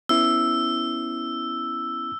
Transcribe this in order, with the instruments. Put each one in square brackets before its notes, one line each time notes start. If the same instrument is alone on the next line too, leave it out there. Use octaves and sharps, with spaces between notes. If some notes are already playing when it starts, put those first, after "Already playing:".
[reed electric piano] B3 C#4 E4 [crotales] E6